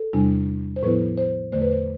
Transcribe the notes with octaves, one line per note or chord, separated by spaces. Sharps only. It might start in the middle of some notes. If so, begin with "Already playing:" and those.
Already playing: A4
E2 C3 G3 D4
C5
A2 F3 B3 E4 B4
C5
E2 D3 A3 C5
B4
C5